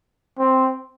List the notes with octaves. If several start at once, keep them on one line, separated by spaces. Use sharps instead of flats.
C4